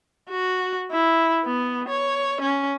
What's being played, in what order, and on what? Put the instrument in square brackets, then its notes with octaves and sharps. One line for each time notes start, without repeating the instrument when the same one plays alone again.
[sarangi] F#4
E4
B3
C#5
C#4